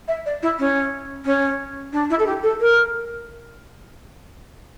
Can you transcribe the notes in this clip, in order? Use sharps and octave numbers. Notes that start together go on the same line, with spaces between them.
E5
D5
E4
C#4
C#4
D4
E4
A4
G4
A4
A#4